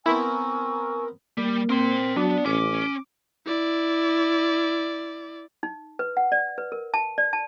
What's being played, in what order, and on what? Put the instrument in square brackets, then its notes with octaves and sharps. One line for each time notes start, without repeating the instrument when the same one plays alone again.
[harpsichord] B3 C4 [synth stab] E4 [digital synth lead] A#4 [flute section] G#5 C#6 E6
[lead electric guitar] G3 [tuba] A#3
[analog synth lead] C4 [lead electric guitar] A#4 C6
[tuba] F#3 [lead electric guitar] B3 [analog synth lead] D4
[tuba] A1 [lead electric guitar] C#4 [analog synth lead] D6
[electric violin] E4 D5
[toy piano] D#4
B4
F#5
D5
B4
A#4
A5
D5
A5